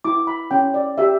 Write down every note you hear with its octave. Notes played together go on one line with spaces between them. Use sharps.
E4 D6
B5
C#4 G5
D5
G4 E5